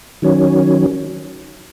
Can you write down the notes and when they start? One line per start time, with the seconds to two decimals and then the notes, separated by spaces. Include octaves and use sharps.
0.22 D#3 F#3 C#4